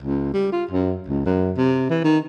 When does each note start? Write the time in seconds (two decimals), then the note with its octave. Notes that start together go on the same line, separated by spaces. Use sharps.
0.03 C#2
0.34 G3
0.52 F4
0.71 F#2
1.08 C#2
1.25 F#2
1.57 C3
1.90 E3
2.04 D#3